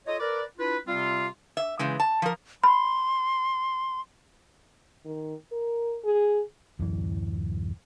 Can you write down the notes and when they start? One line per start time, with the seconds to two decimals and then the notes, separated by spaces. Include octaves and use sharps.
0.07 F4 A4 C#5 D#5
0.19 A#4 B4 D5
0.58 D4 E4 F4 B4
0.87 C3 G3 C4 F4
1.57 E5
1.79 C#3 E3 G#3
2.00 A5
2.22 F3 A#4
2.64 B5 C6
5.05 D#3
5.52 A#4
6.05 G#4
6.79 D1 F#2 E3